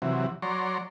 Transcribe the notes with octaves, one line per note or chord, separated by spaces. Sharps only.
C3 E3 F#3
F#3 C#5 D5 A#5 C6